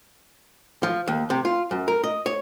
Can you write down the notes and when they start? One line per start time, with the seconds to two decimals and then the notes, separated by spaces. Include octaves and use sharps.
0.83 F3
1.08 D#2
1.30 C3
1.45 F4
1.71 F#2
1.88 A#4
2.04 D#5
2.26 C#5